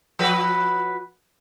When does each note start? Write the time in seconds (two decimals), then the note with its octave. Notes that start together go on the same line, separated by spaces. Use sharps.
0.19 F3 F#4 B4